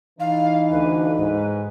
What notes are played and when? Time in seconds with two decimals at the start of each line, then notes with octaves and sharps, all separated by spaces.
0.19 E3 D#4 F5
0.71 D2 D3 B4
1.19 G#2